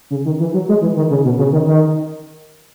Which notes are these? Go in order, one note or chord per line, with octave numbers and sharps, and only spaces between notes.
C#3
D#3
E3
F#3
G#3
E3
D#3
C#3
B2
C#3
D#3
D#3